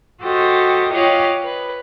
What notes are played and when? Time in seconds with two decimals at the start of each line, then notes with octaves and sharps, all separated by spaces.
0.22 F#4 G4 A4 C5 D#5
0.92 F4 G4 C#5 D#5 F5 F#5
1.44 B4